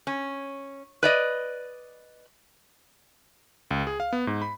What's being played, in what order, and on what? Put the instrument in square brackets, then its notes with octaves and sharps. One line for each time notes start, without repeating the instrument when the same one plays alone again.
[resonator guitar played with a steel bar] C#4
B4 D5 D#5
[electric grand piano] C#2
G#4
F5
B3
G#2
B5